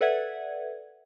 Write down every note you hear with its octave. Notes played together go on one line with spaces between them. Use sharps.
A4 B4 D5 E5 F#5 G#6